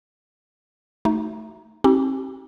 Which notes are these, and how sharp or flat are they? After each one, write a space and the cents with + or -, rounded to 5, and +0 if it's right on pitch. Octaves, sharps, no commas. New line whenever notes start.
A3 +0 D#4 +0 F#4 +0
C4 +35 D#4 +40 G4 -35